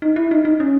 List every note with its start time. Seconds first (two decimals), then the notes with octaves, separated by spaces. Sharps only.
0.02 D#4
0.16 E4
0.31 D#4
0.45 D#4
0.60 C#4